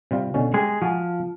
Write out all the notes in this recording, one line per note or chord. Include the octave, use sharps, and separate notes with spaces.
C3 G3 F4
B2 D3 C#4
G#3 G4 G#4
F3 F#4 G#5 A5